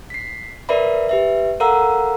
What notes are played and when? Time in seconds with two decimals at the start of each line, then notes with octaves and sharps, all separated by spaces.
0.10 B6 C7
0.69 A#4 B4 D5 E5 B5
1.09 G4 B4 E5
1.60 A4 A#4 F5 F#5 A#5 E6